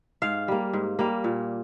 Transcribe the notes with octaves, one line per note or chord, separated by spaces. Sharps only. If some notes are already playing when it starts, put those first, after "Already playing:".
G#2 F5
G3 A#3
G#2
G3 A#3
A#2